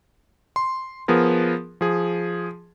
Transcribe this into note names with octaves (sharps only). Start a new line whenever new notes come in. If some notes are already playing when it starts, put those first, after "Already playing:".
C6
F3 B3 G#4 A#4
F3 G#4